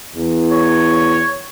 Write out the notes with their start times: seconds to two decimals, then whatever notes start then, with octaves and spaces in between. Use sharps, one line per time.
0.15 E2
0.52 C#5